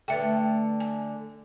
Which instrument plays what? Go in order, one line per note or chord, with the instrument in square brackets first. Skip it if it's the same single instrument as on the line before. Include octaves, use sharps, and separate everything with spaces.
[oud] D3 A3 [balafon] B4 E5 G5
[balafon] G#5